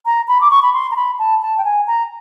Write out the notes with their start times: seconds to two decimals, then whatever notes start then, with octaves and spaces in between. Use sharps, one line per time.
0.06 A#5
0.28 B5
0.41 D6
0.51 C#6
0.62 B5
0.73 C6
0.91 A#5
0.96 B5
1.19 A5
1.42 A5
1.58 G5
1.65 G#5
1.87 A#5